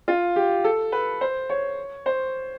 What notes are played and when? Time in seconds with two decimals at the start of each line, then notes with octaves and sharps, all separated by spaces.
0.08 F4
0.36 G4
0.64 A4
0.92 B4
1.21 C5
1.49 C#5
2.06 C5